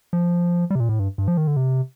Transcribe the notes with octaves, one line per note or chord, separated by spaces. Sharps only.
F3
G3
C3
A#2
A2
G2
G2
F3
D#3
D3
C3